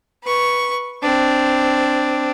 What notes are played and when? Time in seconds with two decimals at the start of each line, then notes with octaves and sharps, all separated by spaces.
0.24 B4 C#6
1.03 C4 D4